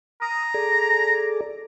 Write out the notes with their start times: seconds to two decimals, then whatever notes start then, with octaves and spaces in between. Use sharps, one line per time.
0.22 A#5 D#6
0.54 G#4 A4 D5